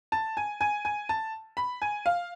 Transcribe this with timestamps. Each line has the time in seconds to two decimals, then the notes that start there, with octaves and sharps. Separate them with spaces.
0.12 A5
0.37 G#5
0.61 G#5
0.85 G#5
1.09 A5
1.57 B5
1.82 G#5
2.06 F5